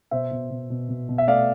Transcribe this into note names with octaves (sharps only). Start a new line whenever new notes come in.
B2 C5 E5
B2
B2
B2
B2
B2
E5
A3 D5 F5